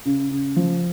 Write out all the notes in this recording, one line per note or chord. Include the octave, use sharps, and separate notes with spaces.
C#3
C#3
F3